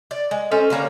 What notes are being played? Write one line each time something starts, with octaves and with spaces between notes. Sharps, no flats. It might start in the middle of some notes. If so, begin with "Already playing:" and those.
D5
G#3
C#4 A4 C5 D#5
D3 G3 A#3 C#5